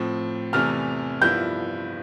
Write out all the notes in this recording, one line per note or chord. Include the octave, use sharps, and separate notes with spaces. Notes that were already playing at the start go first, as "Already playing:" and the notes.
Already playing: A2 F3 C4
E2 C3 E3 A3 F6
G2 F3 B3 E4 G6